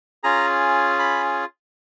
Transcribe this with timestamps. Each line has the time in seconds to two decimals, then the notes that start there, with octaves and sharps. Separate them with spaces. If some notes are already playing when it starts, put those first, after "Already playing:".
0.23 C#4 F4 G#4 A#5
0.99 B5